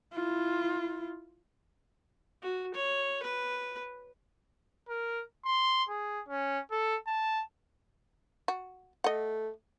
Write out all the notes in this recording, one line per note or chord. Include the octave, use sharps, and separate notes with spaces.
E4 F4
F#4
C#5
B4
A#4
C6
G#4
C#4
A4
A5
F#4
A3 D#5 F#5